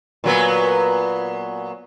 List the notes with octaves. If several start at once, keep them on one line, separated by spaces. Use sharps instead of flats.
A#2 F#3 B3